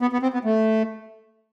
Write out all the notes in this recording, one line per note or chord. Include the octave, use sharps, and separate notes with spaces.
B3
B3
C4
B3
A3